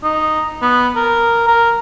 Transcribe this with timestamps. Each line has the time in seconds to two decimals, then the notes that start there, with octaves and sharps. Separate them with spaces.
0.04 D#4
0.62 B3
0.96 A#4
1.47 A#4